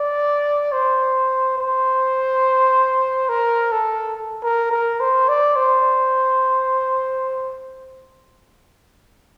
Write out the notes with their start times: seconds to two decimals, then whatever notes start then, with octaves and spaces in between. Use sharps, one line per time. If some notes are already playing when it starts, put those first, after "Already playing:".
Already playing: D5
0.72 C5
1.58 C5
3.29 A#4
3.72 A4
4.43 A#4
4.71 A#4
5.00 C5
5.28 D5
5.56 C5